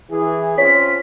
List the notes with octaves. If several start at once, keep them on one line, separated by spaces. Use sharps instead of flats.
E3 G#4
C4 C#4 F4 C#5 B6